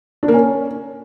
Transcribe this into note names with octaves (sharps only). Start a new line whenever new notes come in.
D4
A#3
C#4